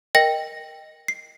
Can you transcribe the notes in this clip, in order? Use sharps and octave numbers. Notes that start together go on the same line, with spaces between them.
A#4 D#5 G5 A#6
C7